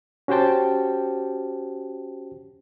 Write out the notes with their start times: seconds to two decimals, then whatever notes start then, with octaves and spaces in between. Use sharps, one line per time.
0.28 C#4 F#4 G4 C5 G5 A5